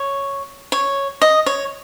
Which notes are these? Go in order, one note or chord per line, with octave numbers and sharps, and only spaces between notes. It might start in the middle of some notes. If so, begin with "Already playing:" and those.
Already playing: C#5
C#5
D#5
C#5